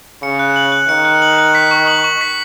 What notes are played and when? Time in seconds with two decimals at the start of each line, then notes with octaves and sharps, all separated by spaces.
0.23 C#3 C#7
0.39 F#6
0.56 F#7
0.72 F#6
0.89 D#3 C#7
1.05 F#6
1.22 F#7
1.38 F#6
1.55 B6
1.71 C#6
1.87 F#7
2.04 C#6
2.21 B6